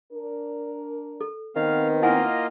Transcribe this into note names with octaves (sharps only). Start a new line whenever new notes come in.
D4 A#4
A4
D#3 B3 C4 F5
A#3 E4 F4 D#5 F#5 G#5